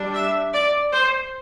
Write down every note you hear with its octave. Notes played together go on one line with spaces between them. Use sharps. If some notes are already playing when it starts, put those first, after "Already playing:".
Already playing: G3 D4
E5
D5
C5